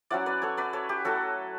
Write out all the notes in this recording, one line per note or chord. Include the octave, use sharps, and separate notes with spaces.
F#3 C#4 E4 D5 F#5
B4 D5
A4 C#5
B4 D5
A4 C#5
G4
F#3 A3 E4 F#4 A4